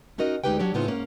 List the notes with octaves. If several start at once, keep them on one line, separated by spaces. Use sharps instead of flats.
C#4 D#4 F#4 A#4 D#5
D2 G#3 D#4 G4 B4 G5
F#3 D4 G4 C#5
A2 C#3 B3 C4 D#4 F4
G#2 A#3 C#4